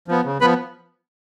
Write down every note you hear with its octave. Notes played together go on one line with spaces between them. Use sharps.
F3 B3
C#3
F3 B3 B4 B5